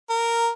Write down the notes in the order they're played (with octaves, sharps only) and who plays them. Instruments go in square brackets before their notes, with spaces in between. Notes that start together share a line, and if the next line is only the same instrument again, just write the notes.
[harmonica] A#4